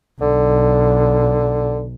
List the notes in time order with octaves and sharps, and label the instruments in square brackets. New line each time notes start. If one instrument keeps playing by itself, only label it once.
[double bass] B1 [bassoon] D3